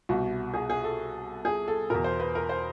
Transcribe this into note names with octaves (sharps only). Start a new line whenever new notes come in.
C2 B2 F#4
G#4
G#4
A4
G#4
A4
E2 B2 A#4
C5
B4
A#4
C5